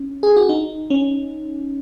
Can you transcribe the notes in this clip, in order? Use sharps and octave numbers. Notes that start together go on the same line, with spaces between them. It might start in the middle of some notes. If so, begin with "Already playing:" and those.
Already playing: C#4
G#4
F#4
D#4
C#4